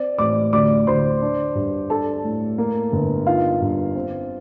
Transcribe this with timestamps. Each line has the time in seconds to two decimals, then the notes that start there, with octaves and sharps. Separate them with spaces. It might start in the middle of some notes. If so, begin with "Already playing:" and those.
Already playing: C4 D5
0.18 A1 D5 D6
0.53 D2 D5 D6
0.87 D2 C5 C6
1.22 D4
1.55 G2
1.90 D4 A4 A5
2.24 A2
2.58 A#3
2.92 G1
3.27 D#4 F4 F5
3.61 G2
3.95 C4